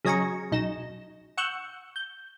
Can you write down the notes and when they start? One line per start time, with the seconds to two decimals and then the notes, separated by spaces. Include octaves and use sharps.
0.05 C#3 F#3 D#5 G#5 A#5 C#6
0.52 B1 D#4 A#6 E7
1.37 F#5 C#6 E6 F#6 G6
1.96 G6